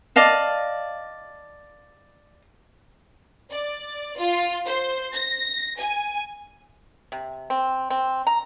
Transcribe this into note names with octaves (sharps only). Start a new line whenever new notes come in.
D5 D#5 F5 A5
D5
F4
C5
A#6
G#5
C3
C4
C4
A#5